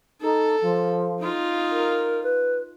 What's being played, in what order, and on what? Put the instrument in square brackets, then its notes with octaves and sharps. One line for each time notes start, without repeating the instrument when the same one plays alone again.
[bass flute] D#4 [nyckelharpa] A4
[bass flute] F3
[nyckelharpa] D#4 F4
[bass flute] A#4
B4